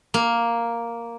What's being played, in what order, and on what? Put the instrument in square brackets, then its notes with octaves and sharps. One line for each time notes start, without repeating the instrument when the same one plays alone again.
[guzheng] A#3